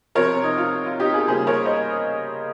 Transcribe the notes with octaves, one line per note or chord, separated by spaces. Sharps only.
C3 F3 C4 A#4 C#5
D#4
F4
F4
D#4 G4
F4 G#4
C#3 G3 A#3 G#4 C5
A#4 C#5
C5 D#5